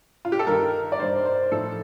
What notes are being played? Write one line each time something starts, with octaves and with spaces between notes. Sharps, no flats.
F4
G4
A4
G2 D#3 A#4
D5
G2 D#3 C5
C5
A2 F3 A4